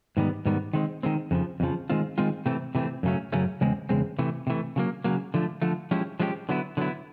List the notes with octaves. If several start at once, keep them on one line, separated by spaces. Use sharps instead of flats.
G#2 D#3 G3 B3
G#2 D#3 G3 B3
D#3 G#3 C4
D#3 G#3 C4
F2 C#3 F3
F2 C#3 F3
D#3 G#3 C4 F4
D#3 G#3 C4 F4
C3 E3 A3 C4
C3 E3 A3 C4
F#2 C#3 F#3 A3 C#4
F#2 C#3 F#3 A3 C#4
E2 C#3 G#3 C4
E2 C#3 G#3 C4
C3 E3 A3
C3 E3 A3
C#3 F#3 A#3
C#3 F#3 A#3
D3 F3 A3
D3 F3 A3
F3 G#3 C#4 E4 G4
F3 G#3 C#4 E4 G4
D3 F#3 B3 E4
D3 F#3 B3 E4